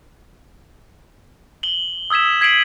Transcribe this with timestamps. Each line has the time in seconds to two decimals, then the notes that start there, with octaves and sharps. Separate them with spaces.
1.63 F#7 G7
2.10 D#6 E6 G#6 B6 E7
2.41 G#6 B6 C7 D7 D#7 F#7